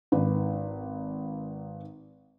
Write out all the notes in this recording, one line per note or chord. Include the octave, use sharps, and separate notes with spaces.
G#1 B4